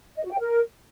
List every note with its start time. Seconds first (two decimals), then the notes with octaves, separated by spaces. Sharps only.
0.16 D#5
0.24 F#4
0.31 G5
0.39 A#4